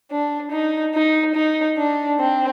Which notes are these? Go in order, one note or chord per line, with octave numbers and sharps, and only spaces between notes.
D4
D#4
D#4
D#4
D4
C4